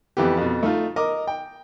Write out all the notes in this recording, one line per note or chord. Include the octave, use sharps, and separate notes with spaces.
F2 E3 B3 G4
F2 B2
A3 D#4 F4
A#4 D#5 D6
G5